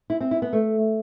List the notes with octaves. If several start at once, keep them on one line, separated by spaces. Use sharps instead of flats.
E4
C4
E4
B3
A3